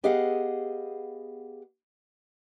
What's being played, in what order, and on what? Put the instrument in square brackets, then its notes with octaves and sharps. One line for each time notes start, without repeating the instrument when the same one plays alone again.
[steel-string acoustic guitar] B3 G4 G#4 D#5 F5 F#5